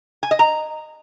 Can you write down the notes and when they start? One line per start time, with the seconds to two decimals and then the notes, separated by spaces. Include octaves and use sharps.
0.23 G#5
0.31 D#5
0.39 A#5